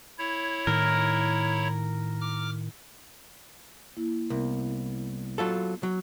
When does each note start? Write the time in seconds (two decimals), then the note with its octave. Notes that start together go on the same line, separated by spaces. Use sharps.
0.19 E4 C#5
0.67 A2 D#3 A#4
2.21 D6 F6
3.97 A#3 E4
4.30 C2 B3 A#4
5.38 F#3 F4 A4
5.83 F#3